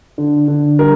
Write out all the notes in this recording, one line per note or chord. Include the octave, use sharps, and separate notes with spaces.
D3
D3
G3 A#4